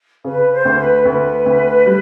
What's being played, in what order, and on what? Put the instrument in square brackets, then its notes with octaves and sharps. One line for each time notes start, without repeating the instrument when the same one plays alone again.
[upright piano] C#3 [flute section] B4
[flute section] C5
[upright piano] D2
[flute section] B4
[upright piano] D2 [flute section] B4
[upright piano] D2
G3